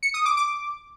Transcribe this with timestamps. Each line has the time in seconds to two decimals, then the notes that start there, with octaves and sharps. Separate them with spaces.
0.03 C#7
0.14 D#6
0.26 D6
0.37 D6